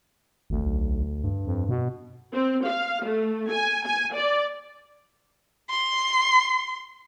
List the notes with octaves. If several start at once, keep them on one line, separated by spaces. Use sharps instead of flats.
G#1 D2
B1
G2
F2
B2
C4
F5
A3
G#5
G#5
D5
C6